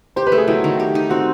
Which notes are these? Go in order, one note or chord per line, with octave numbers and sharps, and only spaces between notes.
G4 C5
B4
A3
G#4
F#3 E4
D#3
G4
D#4
C4 F#4